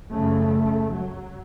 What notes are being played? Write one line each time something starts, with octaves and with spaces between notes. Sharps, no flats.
F#2 C#3 A3
F#3